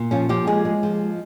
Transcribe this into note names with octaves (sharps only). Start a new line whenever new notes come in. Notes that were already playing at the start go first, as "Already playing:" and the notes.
Already playing: A#2
F3 C#4
F3 G4
G#3 G#4
G#3
F3